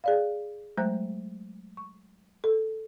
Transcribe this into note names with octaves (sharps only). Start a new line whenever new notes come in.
G#4 D5 F5
F#3 G#3 A3 C5 A#5 F#6
C#6
A4